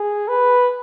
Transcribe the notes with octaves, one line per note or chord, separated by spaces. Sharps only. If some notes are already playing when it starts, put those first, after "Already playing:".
Already playing: G#4
B4